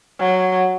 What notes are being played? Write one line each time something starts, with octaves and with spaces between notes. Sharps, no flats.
F#3